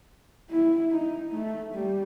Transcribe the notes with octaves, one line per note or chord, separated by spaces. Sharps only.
E4
D#4
A3
G3